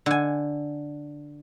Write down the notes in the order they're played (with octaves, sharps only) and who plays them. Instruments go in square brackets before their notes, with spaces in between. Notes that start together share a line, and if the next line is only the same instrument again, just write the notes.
[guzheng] D3 G#5